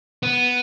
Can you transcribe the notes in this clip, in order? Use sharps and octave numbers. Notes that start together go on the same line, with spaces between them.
B3